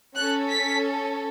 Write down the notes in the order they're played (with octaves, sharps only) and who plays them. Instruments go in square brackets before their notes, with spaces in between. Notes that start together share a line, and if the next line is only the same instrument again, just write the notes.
[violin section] C#4 A4 F#6
B6